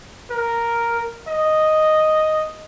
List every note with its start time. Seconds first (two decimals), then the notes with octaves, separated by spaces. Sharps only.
0.30 A#4
1.28 D#5